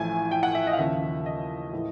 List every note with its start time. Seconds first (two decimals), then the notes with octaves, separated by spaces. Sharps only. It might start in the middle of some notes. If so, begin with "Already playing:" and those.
Already playing: A1 A2 F3 G#5
0.31 G5
0.43 F#5
0.55 E5
0.67 D#5
0.73 F5
0.78 D#2 C#3 F3 E5
1.26 D#5
1.73 A2 E3